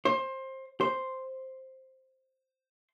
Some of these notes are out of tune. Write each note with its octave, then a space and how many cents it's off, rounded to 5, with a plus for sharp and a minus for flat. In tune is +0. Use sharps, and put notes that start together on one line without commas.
C5 +20
C5 +0